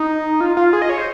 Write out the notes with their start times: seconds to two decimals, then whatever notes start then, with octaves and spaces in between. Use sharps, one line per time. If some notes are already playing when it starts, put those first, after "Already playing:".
Already playing: D#4
0.41 F4
0.57 F4
0.73 G#4
0.82 D#5
0.89 C#5
0.98 C5